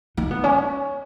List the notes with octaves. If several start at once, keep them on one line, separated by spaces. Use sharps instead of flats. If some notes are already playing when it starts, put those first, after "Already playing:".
D#4
B3
C#4